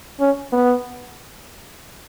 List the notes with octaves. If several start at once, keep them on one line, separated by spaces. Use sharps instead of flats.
C#4
B3